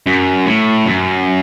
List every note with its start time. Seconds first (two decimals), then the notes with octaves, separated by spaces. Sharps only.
0.07 F#2
0.46 A2
0.86 F#2